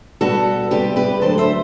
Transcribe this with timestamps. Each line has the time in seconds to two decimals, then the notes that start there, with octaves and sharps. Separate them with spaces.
0.21 B2 G3 B3 F#4 A4
0.71 C3 G3 B3 G4 B4
0.96 G4 B4
1.21 D3 F#3 A3 A4 C5
1.38 C5 E5